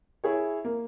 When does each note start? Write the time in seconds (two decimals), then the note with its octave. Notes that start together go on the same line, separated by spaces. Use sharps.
0.24 E4 G#4 C#5
0.65 A#3